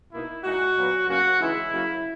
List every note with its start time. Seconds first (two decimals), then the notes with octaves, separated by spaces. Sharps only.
0.12 B2 A#3 D#4 E4
0.44 A#2 G#3 D#4 F#4
0.76 A#2 F#3 B3
1.08 F#2 C#3 F#3 A#3 C#4 F#4
1.39 C#3 E3 G#3 D#4 E4
1.72 C#3 F#3 A#3